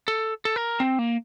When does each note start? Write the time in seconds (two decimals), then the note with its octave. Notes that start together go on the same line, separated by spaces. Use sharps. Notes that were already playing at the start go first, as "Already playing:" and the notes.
0.08 A4
0.45 A4
0.56 A#4
0.80 C4
0.99 A#3